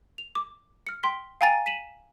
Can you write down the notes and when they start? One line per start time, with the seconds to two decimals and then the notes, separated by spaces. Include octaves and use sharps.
0.18 F7
0.35 D6
0.87 F6 C#7
1.03 G5 C6 B6
1.41 F5 G5 G#5 A#5 A6 D#7
1.66 B6 D#7 E7 F#7